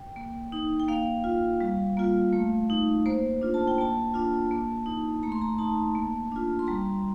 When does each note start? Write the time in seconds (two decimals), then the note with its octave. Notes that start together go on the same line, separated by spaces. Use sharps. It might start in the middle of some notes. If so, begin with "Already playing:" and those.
Already playing: G5
0.16 A#3
0.52 D#4
0.80 G5
0.88 A#3 F5
1.24 F4
1.61 G3
1.97 A#3 F4
2.33 A3
2.70 D#4
3.06 A#3 C5
3.41 D4 F4
3.54 A5
3.67 G5
3.78 A#3 A5
4.14 D4 F4
4.51 A#3
4.86 D#4
5.23 A3 A#5
5.32 C6
5.41 A#5
5.58 D#4 A5
5.95 A#3
6.32 D4 F4
6.59 C6
6.67 G3 A#5